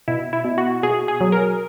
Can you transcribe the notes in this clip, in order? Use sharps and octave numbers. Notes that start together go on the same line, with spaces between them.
B2 E4
E4
B2
F#4
B2 G#4
G#4
F#3
A#4